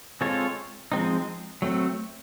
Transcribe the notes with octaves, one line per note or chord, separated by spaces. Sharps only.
G#3 C4 F4 A4 C#5
F3 G#3 C4 D#4
F#3 A3 C4